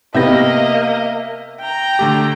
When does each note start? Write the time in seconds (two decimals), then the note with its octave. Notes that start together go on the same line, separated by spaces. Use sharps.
0.14 C3 A#3 B3 D#5 E5 G6 A#6
1.61 G5 A#5
1.99 D3 A3 G4